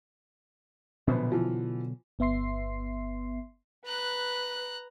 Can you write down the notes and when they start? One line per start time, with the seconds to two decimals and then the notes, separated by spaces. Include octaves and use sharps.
1.07 A#1 B2 D3 F#3 B3 C5
1.32 E3 F3
2.19 G1 B3 E5 C6 C7
3.86 B4 A#5 F#6